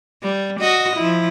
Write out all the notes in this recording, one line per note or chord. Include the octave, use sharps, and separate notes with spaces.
G3
F#4 D#5
F3 E4